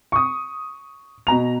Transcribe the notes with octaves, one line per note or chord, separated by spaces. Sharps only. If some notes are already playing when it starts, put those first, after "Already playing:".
C#6 D#6
B2 A#5 F7